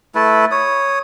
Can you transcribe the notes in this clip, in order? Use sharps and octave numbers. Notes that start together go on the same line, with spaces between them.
A3 E4 A4 B4
C#5 D#6